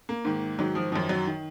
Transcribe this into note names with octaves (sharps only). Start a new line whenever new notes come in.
A#3
G#2 D#3
G#2 D#3 F#3
F3
F#2 D#3 F3
F#3
D#3